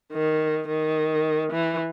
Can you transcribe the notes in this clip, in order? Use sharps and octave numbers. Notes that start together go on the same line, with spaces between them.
D#3
D#3
E3